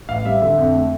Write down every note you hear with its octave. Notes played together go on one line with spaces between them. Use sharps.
A1 F5
G3 E5
D3 E5
F2
A3